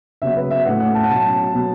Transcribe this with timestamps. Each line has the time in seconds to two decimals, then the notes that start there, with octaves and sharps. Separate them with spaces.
0.22 C#3 F#3 B3 E5
0.37 B4
0.51 E5
0.65 A2 A3 C#4 F#5
0.80 F#5
0.95 A5
1.04 F#5
1.10 B2 F#3 C#4 A5
1.53 B2 F#3 B3